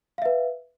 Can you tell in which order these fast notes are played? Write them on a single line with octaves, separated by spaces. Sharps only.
F5 E5 B4